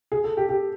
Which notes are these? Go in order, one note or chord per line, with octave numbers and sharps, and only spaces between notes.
G#4
A4
G4
G4